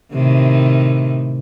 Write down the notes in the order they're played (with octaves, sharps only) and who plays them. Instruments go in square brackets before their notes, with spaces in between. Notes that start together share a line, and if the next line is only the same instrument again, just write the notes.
[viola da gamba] A2 C3 D#3